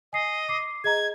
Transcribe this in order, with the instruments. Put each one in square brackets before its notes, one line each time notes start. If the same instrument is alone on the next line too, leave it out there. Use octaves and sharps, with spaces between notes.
[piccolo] D#5 [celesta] G#5 C7
[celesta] D6 C7
[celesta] G#4 D#5 A#5 [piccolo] G#6